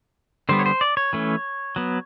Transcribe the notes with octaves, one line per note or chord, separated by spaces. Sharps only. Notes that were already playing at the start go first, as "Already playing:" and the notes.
D3 G3 B3 C5
C#5
C5
D5
C#5
E3 A3 C#4
F#3 B3